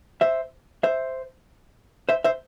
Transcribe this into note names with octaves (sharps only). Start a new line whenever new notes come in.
C5 E5
C5 E5
C5 E5
C5 E5